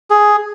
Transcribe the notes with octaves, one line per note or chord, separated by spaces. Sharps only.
G#4